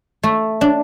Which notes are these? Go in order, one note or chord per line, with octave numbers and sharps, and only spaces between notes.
A3
D4